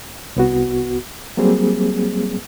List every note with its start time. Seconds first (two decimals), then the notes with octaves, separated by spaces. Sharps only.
0.36 C2 B3 F#4
1.37 F#3 G3 A#3 C4 G#4